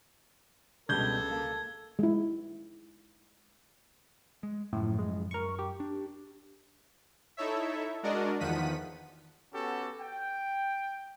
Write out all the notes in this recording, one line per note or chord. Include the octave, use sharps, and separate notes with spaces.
C#2 B2 G3 D4 A4 G6 G#6 G7
A#3
G#3 E4
G#3
F#2 A2 C#3 F3
G#3
F#2 A#4 C#6
G4
D4
D#4 E4 A4 C#5 E5
G#3 D4 F#4 A#4 D5 D#5
E2 D#3 F3 F#5 B6 D#7
B3 C#4 F#4 G4 A4
G5